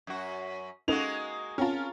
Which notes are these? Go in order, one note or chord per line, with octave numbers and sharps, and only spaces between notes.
F#2 F#4
G#3 A#3 C#4 D#4 F#4 A4 F7
C4 C#4 F4 A#4 F#5 A5